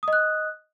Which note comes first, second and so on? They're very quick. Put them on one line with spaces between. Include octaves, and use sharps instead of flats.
D#6 D#5 F#6